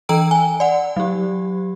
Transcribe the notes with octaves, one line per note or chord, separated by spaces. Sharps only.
E3 A4 G5 A#5 E6 D7
G#5
D5 F#5
F#3 G4